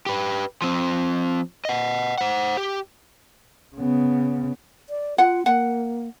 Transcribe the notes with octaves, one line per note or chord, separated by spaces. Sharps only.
G4 B4
F3 C4
D#5 F#5
C5 F#5
G4
C#3 B3
D5
F4 F#5
A#3 F#5